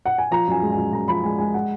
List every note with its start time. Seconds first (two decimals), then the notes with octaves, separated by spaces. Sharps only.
0.06 F#5
0.18 G#5
0.31 F3 A#5
0.48 F#2 G#5
0.62 G#3
0.72 G#5
0.78 F#2
0.93 F#2 A#5
1.08 F3 B5
1.24 G#3 G#5
1.38 G#3 G#5
1.54 F#5